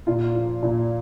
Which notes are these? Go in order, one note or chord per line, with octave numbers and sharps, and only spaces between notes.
A#2 F4
F3
A#2